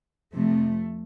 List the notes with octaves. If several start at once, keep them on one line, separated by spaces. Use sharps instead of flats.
F2 C3 F3 A3